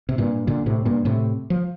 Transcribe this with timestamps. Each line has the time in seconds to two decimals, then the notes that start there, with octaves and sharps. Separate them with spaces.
0.09 C3
0.18 G2 A#2
0.47 A#2 D3
0.66 A2 C3
0.85 G2 A#2
1.05 A2 C3
1.50 F3